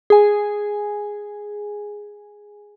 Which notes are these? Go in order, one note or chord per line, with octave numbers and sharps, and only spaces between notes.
G#4 G#5